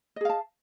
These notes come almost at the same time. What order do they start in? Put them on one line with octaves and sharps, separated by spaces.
D#5 G#4 F5 A5